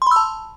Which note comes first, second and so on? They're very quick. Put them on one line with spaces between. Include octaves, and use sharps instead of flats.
C6 B5 E6 A5